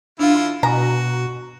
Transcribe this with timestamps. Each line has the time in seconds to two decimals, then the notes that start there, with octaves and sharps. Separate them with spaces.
0.19 D3 D4 E4 F4 F5
0.63 B2 F#4 G#5 A#5